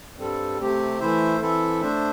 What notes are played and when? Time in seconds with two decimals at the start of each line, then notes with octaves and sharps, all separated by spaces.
0.16 G2 G3 C4 A4
0.59 C3 A3 C4 G4
1.00 E3 A3 E4 C5 E5
1.41 E3 C4 E4 A4 E5
1.81 A3 D4 C5 E5